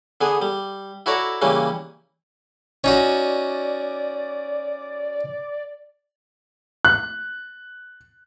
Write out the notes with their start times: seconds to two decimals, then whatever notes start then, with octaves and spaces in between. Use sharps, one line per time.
0.21 D3 B3 G#4
0.42 G3
1.06 E4 F#4 A4 C#5 D5 A#5
1.42 C#3 E3 G3 A#3 C#4
2.84 C#4 D#4 F#4 D5
6.85 F#6